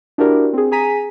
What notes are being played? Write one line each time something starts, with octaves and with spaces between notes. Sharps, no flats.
D4 E4 F#4 G4 A#4 D5
C4 G#4
G#4 G#5 A#5 B6 D#7